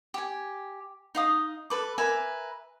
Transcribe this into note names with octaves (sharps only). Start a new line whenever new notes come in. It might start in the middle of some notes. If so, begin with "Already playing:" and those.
G4 G#5
D#4 F5 D#6
A4 B4 D6
A#4 B4 E5 G#5